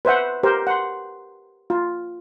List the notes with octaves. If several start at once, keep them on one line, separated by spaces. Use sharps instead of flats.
B4 C5 E5 F#5
G4 A#4 C5
F#5 C6
F4